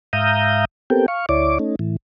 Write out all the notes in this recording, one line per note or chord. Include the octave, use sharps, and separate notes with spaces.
G#2 E5 F5 A#5 D#6 G6
B3 C4 G4 A4 A#4 G5
F5 C#6
D2 E4 C#5 D5 D6
A3 C#4 D#4
A2 E3